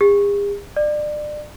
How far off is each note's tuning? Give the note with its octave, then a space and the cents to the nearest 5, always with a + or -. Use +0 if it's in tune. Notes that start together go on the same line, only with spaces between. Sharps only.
G#4 -45
D5 +30